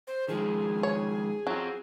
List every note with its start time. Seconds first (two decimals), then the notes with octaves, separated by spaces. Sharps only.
0.07 C5
0.28 D#3 F3 G#3 G#4
0.83 C#5
1.47 F#3 C4 F4